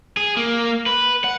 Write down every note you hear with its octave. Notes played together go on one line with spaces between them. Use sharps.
G#4
A#3
B4
F#5